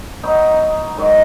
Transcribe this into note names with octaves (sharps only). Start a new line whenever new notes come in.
F#3 B3 D#4
G#2 D#3 F#3